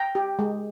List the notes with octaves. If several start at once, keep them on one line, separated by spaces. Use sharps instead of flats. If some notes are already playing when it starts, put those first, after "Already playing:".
Already playing: G5 A#5
G4
G#3